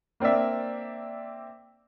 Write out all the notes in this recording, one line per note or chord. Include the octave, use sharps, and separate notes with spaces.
A#3 C4 D4 D5 E5